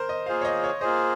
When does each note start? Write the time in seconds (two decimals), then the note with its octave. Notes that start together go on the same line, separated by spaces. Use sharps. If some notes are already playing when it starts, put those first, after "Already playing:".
Already playing: A#4 C5
0.09 D#5
0.26 A#3 F4 G#4 C5 F5
0.41 C#5
0.45 D#5
0.64 C#5
0.81 A#3 F4 G#4 C5 D#5